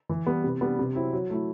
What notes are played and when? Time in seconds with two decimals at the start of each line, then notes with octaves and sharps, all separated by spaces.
0.09 E3
0.26 G3 B3
0.44 C3
0.61 G3 B3 D4
0.79 C3
0.96 F#3 C4 E4
1.13 F#3
1.30 A3 E4